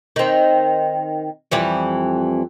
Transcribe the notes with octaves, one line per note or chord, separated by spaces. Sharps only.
D#3 C4
F2 E3 G3